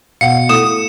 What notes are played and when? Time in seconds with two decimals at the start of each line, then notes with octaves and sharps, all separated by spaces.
0.21 B2 F5 F#5 C#7
0.49 A3 E4 A4 D#6 E7